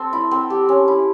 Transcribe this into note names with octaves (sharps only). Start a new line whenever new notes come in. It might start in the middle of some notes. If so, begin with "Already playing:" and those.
Already playing: C4 A4
E4
C4
G4
C#4
E4